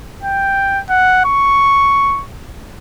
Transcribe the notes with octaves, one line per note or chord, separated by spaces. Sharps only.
G5
F#5
C#6